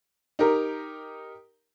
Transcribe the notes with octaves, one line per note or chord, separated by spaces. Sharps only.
D#4 G4 A#4 A#5